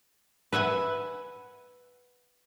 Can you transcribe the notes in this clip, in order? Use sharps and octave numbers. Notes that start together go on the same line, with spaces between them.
B4 E5 F#5 G#5